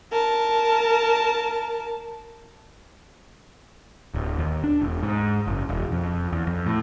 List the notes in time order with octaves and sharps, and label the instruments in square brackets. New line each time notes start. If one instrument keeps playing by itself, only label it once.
[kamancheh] A#4 A5
[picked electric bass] D1
D#2
D4
E1
G#2
F#1
E1
F2
E2
F2
A2